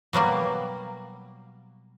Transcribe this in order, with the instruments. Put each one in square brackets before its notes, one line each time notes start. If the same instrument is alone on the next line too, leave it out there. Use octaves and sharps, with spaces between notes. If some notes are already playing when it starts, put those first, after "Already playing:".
[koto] B2 F#3 G3 A#3